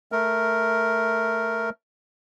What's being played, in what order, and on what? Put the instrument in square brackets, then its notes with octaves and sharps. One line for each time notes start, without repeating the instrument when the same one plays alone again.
[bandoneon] A3 A#4